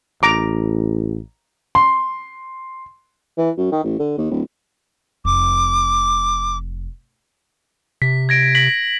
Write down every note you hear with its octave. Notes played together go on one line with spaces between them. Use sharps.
A1 A#5 D6
C6
E3
F#2
D#3
A1
D3
D#2
D1
F1 D6
C3 B6
G#6 A#6 D7
A#6 B6 F#7